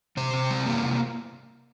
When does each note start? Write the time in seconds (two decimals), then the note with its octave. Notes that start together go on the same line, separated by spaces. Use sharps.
0.17 C3 C5
0.33 C3
0.50 G3
0.66 A#3
0.83 C3